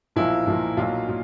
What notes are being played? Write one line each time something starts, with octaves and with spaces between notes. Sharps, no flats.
B1 A#2 F3 A#3 E4
B1 A#2 F3 A#3
B1 A#2 F#3 A#3 F4
A#2